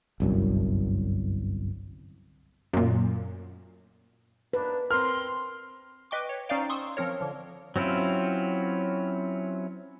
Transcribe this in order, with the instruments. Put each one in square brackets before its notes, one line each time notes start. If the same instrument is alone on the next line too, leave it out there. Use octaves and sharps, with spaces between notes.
[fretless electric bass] G1 C2 F#2
[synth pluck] F#2 A#2
[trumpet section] A#3 D4 D#4 [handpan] B4
[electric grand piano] C4 A#4 [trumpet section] C6 [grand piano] F6
[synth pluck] B4 D#5 G5 C#6 D6
C#5
C#4 D#4 C5 D5 F5 G5
C6 C#6 D#6 E6
F3 C4 A#4 C#5
D3 F3
[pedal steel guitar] F#3 C4 C#4 E4 F4